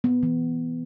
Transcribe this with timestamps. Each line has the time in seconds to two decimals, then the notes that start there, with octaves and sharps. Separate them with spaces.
0.04 B3
0.23 E3